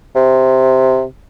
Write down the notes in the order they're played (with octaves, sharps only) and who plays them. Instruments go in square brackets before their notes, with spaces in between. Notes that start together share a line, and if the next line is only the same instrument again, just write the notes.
[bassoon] C3